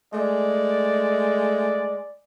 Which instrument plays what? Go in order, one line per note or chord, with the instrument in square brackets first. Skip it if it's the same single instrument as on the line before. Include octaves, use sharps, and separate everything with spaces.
[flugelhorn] G#3 [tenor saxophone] A3 [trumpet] D5